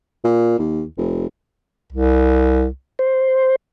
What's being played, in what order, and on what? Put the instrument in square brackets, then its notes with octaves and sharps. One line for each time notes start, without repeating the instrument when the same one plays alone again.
[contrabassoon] A#2
D#2
F1
[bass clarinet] C2
[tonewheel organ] C5